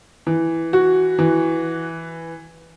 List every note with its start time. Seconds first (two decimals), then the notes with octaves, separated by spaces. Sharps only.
0.27 E3
0.73 F#4
1.19 E3